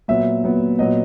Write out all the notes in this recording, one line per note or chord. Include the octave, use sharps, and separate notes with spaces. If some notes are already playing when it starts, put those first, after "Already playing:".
A#2 F#3 B3 E5
A#2 F#3 B3
A#2 F#3 B3 D#5